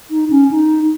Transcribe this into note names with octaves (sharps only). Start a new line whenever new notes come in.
D#4
C#4
D#4